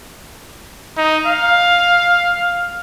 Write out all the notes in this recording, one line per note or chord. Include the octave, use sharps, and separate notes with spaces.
D#4
F5